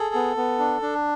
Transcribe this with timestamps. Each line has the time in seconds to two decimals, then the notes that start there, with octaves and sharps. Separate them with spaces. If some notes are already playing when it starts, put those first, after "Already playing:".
Already playing: G#4 A4
0.15 B3
0.37 B3
0.59 D4
0.82 D4